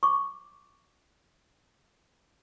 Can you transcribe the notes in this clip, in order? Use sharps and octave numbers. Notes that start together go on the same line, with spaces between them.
C#6 D6